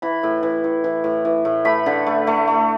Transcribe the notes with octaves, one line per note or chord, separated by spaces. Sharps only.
E3 B5
A2
E3
A2
E3
A2
E3
A2
A3 B5
D3
A3
A3
A3